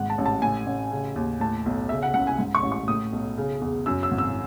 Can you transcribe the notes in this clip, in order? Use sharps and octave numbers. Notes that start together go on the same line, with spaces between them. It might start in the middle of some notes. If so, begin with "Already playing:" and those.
Already playing: G#1 G#2 F#5
A5
A1
A5
A2 G#5
A1
C#3
D#2
A2 A5
B1
C#3 E5
F#5
C#2 F#5
G#5
G#2
C#6
A1
C#6
A2 D#6
B1
C#3
E2
F#2 E6
E6
G#1
E6